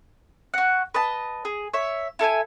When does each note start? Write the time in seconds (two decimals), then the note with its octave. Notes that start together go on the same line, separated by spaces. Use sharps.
0.54 F#4 F#5
0.94 B4 D#5 A5
1.45 G#4
1.74 C#5 E5
2.19 E4 A4 E5 G#5